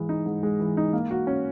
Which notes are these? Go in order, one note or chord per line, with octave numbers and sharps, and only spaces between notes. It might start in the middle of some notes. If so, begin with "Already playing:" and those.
Already playing: G#2 E3 G#3
D#4
G#2
G#3
E3
D#4
A#3
F#4
C#4